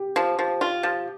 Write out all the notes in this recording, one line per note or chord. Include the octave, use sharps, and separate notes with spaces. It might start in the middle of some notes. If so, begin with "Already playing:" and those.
Already playing: G4
F3
F3
F4
F3